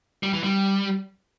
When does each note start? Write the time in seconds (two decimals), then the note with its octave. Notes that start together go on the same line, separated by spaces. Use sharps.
0.23 G3
0.33 E3
0.43 G3